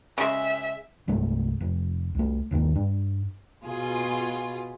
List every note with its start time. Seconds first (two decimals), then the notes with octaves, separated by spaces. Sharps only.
0.18 C#3 G#3 E5
1.08 C2 G2 G#3 A3
1.61 F1
2.15 C2 A3
2.51 G1 D#2 D#3 A#3
2.75 G2 D4
3.66 B2 F4 G#4